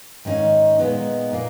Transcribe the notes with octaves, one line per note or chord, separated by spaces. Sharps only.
G#2 D#3 A#3 C#4 D#4
A#2 G#3 B3 D#4
A#2 A#3